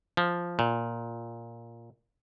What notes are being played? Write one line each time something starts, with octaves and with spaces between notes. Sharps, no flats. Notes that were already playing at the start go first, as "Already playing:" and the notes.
F3
A#2